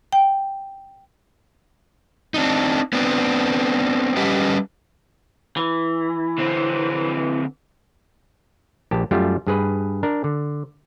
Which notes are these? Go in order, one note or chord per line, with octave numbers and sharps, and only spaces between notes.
G5
C4 D4 D#4
B3 C4 D4
G3 C#4 G4 B4 D#5
E3
D3 C4
A#1 G4 A5
F#2 G3 A3 F4 G4
G2 G#4 B4
D4 A#4
D3